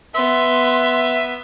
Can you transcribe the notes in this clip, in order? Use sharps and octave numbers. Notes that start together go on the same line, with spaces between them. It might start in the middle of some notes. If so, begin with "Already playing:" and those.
B3 E5 C6